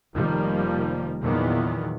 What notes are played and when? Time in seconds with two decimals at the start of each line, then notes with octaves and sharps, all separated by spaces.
0.13 F1 D#3 F3 G3 A#3
1.21 E2 A#2 D#3 E3 F#3 B3